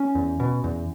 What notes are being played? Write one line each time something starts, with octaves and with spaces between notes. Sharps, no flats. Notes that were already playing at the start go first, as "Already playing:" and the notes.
Already playing: C#4
E2
B2
E2